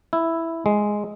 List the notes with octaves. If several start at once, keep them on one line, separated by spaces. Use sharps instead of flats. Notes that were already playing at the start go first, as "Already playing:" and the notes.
E4
G#3